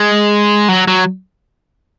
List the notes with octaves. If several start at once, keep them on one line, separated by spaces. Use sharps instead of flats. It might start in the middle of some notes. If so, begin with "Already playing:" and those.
Already playing: G#3
F#3
F#3